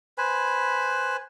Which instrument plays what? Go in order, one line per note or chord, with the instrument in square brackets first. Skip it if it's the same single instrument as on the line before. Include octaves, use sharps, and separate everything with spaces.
[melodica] B4 C5 G#5 B5